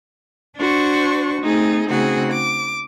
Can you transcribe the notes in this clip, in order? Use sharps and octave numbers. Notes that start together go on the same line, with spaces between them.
D4 F#4 C5 C#6
A3 C4 D#4 G#4
C#3 A3 C4 D#4 F#4 G#4
D6